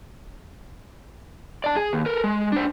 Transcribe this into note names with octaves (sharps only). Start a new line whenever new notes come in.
D5 A5
G#4
D#2
A4 A#4
G#3
D4 C5